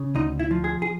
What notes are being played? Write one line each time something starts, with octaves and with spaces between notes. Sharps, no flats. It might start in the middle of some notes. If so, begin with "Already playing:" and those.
Already playing: C#3
D2 D#4
E4
F3
G#4
G#4